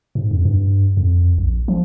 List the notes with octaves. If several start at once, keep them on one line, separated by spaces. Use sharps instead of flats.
G#2
F2
G2
F2
A#1
F3